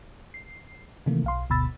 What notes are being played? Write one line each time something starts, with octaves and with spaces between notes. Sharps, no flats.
C7
C3 D#3 E3 A3 A#3
B1 F5 C6
G1 D2 B2 B5 E6 A6